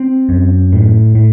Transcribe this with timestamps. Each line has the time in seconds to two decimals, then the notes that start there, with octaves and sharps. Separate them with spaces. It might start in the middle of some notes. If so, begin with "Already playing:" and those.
Already playing: C4
0.29 F#2
0.73 A2
1.15 A2